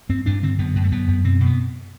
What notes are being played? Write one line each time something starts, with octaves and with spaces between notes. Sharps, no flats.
G2 C4
G2 D4
D3 C4
F#2 B3
F#2
A3
F#2 B3
F#2
B2 C4
B2
B3